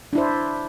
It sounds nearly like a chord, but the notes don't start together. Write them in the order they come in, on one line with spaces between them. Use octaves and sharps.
D4 E4 C5